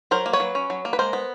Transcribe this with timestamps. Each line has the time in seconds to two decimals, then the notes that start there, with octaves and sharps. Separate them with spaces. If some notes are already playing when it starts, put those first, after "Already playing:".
0.11 F#3 A#4 C5
0.26 A#3
0.33 B4 C#5
0.40 F#3
0.55 C#4
0.70 F#3
0.85 A#3
0.93 B4
0.99 G#3 A#4 C5
1.13 B3